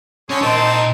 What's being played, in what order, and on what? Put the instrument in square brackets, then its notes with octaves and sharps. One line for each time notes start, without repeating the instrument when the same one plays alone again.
[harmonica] D3 G#4 C#5 [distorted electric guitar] C#4
[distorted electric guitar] A#2 [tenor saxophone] D#3 [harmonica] C4 C5 A5
[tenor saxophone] D#4
D#4